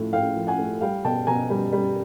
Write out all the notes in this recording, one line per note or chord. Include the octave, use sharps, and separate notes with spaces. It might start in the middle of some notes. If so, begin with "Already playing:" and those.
Already playing: A2 F3 A3
A2 F5 G5
F3
F#5 G#5
A3
G3 F5 G5
B2 G5 A5
B2 G#5 A#5
G3
G3